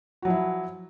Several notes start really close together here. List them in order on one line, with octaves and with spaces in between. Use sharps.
F#4 F#3 F3 E4